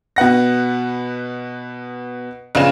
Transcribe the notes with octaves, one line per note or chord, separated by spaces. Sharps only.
B2 B3 F#5 A#6
A#1 C#3 B3 F4 G#4 E7